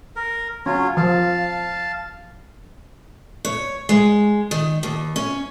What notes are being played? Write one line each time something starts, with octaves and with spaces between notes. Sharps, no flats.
A#4
F#3 C#4 F4 C#5
F3 F5 A5
C#5
G#3
D#3
D#2
C#4